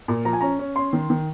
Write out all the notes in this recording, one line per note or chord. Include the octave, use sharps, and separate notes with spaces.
A#2
F3 A#5
G#5
C#4 A#5
C#4
C#4 C6
D#3
D#3